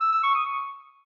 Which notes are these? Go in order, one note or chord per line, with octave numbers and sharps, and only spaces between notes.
E6
E6
C#6
D#6
C#6